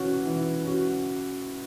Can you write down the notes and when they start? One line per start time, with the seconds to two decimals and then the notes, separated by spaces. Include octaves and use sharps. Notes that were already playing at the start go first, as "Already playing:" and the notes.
Already playing: E3 C#4 F#4
0.25 E3
0.64 C#4 F#4